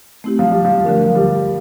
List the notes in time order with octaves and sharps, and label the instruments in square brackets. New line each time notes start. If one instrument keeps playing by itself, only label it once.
[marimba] A3 C4 E4 G4
[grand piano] F3
G3
F3
[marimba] D3 A3 D4 G4 A#4
[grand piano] F3
G3